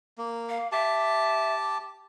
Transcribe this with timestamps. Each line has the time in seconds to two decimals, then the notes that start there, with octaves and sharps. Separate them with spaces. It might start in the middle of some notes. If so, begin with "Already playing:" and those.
0.18 A#3
0.49 F5
0.72 G4 E5 A5